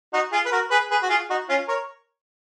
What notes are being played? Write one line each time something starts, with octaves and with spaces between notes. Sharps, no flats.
D#4 F#4
F4 G#4
B4
F#4 A#4
G#4 B4
G#4 B4
F#4
F4 G#4
D#4 F#4
C#4 F4
A#4 C#5